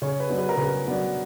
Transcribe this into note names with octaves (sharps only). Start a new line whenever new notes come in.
C#3 C#5
B4
F#3 B3 D4
B4
A#4
C#3 B4
F#3 B3 D4